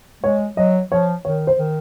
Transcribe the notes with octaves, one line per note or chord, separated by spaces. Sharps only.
G#3 C#5
F#3 D#5
F3 C#5
D#3 C#5
C5
D#3